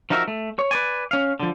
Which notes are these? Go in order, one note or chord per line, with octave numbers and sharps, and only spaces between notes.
F3 D#4 F#4 A#4 D#5 E5
A3
C#5
B4 C#5 D5 G#5
C#4 F5
D3 F3